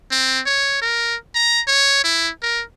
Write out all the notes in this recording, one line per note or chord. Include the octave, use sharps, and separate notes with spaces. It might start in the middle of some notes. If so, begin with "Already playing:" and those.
C4
C#5
A#4
A#5
C#5
E4
A#4